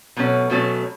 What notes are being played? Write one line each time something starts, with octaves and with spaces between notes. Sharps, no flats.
B2 F#3 A3 C#4
B2 F#3 A3 C#4